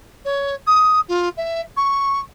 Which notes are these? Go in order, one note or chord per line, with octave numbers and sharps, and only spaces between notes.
C#5
D#6
F4
E5
C#6